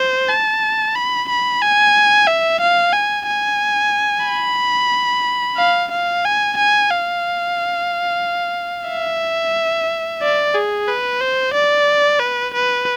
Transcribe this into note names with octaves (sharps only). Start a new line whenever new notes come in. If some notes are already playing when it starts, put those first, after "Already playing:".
Already playing: C5
A5
B5
B5
G#5
E5
F5
G#5
G#5
B5
F5
F5
G#5
G#5
F5
E5
D5
G#4
B4
C5
D5
B4
B4